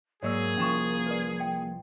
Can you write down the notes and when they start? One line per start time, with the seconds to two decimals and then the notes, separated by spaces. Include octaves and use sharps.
0.23 G#2 F#3 A#3 G#4 C#5 D5 E6
0.58 C2 F3 C#4 C5 C#6
1.06 B4 D5
1.40 G5